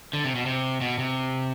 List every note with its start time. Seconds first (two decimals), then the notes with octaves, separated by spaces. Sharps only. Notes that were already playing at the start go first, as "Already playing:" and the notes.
0.13 D3
0.24 C3
0.35 B2
0.46 C3
0.81 B2
0.98 C3